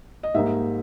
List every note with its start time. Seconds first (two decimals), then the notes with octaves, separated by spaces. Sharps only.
0.23 D#5
0.34 G#2 G3 A#3 D#4 E5